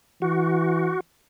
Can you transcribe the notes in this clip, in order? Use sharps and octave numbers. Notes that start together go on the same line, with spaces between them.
E3 F#4